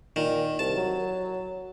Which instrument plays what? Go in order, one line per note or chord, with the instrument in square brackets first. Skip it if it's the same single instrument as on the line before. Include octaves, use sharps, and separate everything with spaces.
[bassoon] A#2 [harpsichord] D#3
[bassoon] C2 [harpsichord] A5
[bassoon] F#3